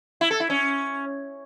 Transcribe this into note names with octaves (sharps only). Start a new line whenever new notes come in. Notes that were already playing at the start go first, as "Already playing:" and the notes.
E4
A4
E4
C#4